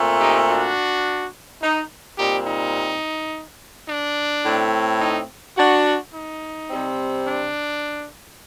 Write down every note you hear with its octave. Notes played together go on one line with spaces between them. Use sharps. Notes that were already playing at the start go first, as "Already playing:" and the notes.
Already playing: A#2 A3 C4
D#4 G4
D4 F#4
D#4
A#2 G3 C4 D#4 G4
D#4
D4
A2 A3 C4
D#4
D4 F#4
D#4
C3 G3 C4
D4